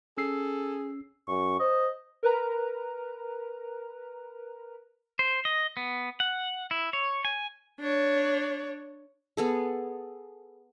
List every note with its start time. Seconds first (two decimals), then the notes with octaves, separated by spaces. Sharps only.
0.18 C#4 G#4 A4 E6 C7
1.28 F#2 C#6
1.60 C5 D#5
2.23 A#4 B4 A#5
5.19 C5
5.45 D#5
5.77 B3
6.20 F#5
6.71 E4
6.93 C#5
7.25 G#5
7.80 D4 C#5
9.37 B3 G#4 A4